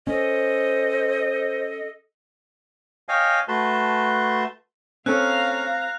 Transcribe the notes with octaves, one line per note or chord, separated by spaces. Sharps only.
C#4 A4 C5 D#5
C#5 D#5 F5 G5 G#5
A3 F#4 B4 A5 C6
C4 C#4 A4 F5 A#5 F#6